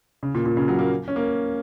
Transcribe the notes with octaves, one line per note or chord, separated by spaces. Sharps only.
C#3
A#2
A#2
C#3
F#3
A#3
C#4
A#3